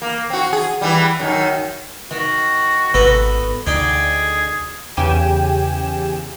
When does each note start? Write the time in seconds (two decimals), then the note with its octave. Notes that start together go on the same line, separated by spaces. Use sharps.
0.02 A#3
0.30 C4 F#4
0.53 G#4
0.81 E3 G3
1.20 F#2 D#3
2.11 D#3 F#4
2.94 G#1 B3 A4 B4
3.67 D2 D#4 G#4 D5 G5
4.97 E2 C#3 G4 G5 G#5 E7